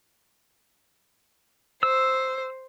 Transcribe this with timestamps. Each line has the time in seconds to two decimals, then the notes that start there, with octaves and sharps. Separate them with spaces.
1.83 C5 E6